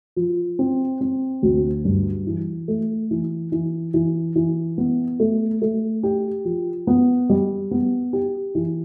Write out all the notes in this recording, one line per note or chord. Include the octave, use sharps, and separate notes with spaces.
F3
C4
C4
D2
G2
E3
A3
E3
E3
E3
E3
B3
A3
A3
G4
F3
B3
G3
B3
G4
E3